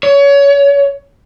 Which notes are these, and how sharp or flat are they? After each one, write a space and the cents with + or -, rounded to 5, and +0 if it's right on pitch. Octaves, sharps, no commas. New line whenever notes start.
C#5 +25